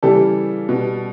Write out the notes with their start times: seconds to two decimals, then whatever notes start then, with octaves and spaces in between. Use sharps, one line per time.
0.03 C#3 E3 G3 G4 A4
0.69 B2 G3